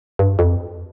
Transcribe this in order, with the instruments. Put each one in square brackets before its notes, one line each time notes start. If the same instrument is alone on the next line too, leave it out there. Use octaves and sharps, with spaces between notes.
[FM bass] G2
F2